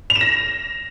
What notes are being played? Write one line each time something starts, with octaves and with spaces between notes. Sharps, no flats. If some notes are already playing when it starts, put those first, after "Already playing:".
F7
E7
A#6